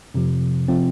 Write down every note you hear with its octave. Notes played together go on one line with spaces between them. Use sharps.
F2 C3 F3
C3 F3 C4